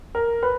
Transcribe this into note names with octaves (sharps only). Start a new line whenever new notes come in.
A#4
B4